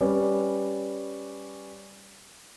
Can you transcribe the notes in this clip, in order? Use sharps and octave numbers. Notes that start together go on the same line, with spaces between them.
G3 C#4 B4 D5